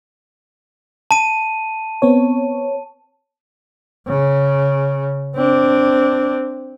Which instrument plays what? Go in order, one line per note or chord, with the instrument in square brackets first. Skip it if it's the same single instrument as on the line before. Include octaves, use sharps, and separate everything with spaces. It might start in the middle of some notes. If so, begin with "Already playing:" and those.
[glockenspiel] A5 D#7
[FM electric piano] B3 C4 C#5
[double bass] C#3
C4 D4